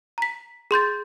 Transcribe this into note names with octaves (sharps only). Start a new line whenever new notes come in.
A#5 B6
G#4 C6 G6 A6